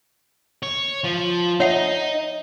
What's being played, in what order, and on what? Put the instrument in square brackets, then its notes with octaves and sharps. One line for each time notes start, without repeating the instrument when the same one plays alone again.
[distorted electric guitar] C#5
F3
[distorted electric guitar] D#4 D#5 [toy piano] C#5 E5 F#5